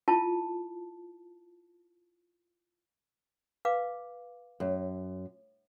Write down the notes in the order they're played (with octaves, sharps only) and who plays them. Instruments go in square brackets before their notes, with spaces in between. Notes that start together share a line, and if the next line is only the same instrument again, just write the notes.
[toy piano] E4 F4 A5
B4 F5 D6
[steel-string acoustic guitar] F#2